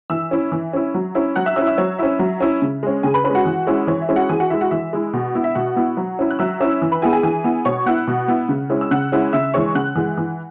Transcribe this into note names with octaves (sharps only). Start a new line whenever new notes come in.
E3 E5 E6
C#4 E4
E3
C#4 E4
F#3
C#4 E4
F#3 F#5 F#6
E5 E6
C#4 E4 E5 E6
E5 E6
F#3 C#5
C#4 E4 E5
F#3
C#4 E4
C#3
G#3 C#4
C#3 G#4 G#5
B4 B5
C#4 B4 B5
G#3
F#4 F#5
E3
G#3 C#4 E4
E3 C#5
E5
G#3 C#4 E4
F#4 F#5
E3 G#4 G#5
F#4 F#5
G#3 E4 E5
F#4 F#5
E3 E5
G#3 E4
B2
B3 E4
E5
B2 F#4 F#5
B3 E4
F#3
C#4 E4
F#6
F#3 E5 E6
C#4 E4 E5 E6
E3
B4 B5
B3 E4 G#4 G#5
G#4 G#5
E3 G#4 G#5
B3 E4
B2 C#5 C#6
B3 E4 F#5 F#6
B2
B3 E4
C#3
G#3 C#4 E4
E6
C#3 F#5 F#6
G#3 C#4 E4
C#3 E5 E6
E3 G#3 C#5 C#6
C#3 F#5 F#6
E3 G#3
E3